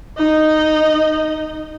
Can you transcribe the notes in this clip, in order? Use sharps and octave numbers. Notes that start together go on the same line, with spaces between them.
D#4 D#5